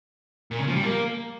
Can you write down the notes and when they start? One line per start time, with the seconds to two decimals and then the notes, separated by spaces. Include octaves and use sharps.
0.51 A#2
0.59 C#3
0.67 F3
0.76 G3
0.84 A#3